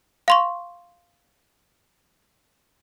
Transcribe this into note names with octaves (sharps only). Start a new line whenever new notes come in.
F5 C6 C#6